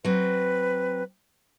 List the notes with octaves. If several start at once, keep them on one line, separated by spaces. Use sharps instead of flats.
F#3 C4 B4